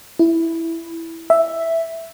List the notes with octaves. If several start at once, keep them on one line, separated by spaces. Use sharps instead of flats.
E4
E5